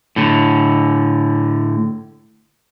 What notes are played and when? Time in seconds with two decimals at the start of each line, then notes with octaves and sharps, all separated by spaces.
0.16 A2 D3